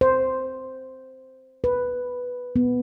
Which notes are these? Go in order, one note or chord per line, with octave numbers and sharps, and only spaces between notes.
C5
B4
B3